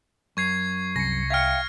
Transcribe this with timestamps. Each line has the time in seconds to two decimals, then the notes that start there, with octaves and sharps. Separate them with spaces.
0.37 F#2 C#6 G#6 C7
0.96 C2 A#6 C#7
1.30 E5 F5 G5 F6 G#6